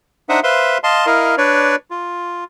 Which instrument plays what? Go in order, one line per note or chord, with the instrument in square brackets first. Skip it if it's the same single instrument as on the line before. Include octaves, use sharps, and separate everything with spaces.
[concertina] D4 D#4 C5 E5 F#5 D#6
B4 C5 E5 F5 C6
D#5 F5 A5 C6
E4 A#4 D#5 F5
D4 B4 C#5 D5
F4